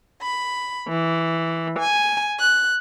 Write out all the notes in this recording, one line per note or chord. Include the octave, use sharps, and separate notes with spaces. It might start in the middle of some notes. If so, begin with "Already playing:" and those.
B5
E3
G#5
F#6